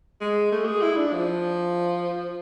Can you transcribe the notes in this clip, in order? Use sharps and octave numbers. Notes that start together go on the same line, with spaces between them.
G#3
A3
G#4
E4
D4
F3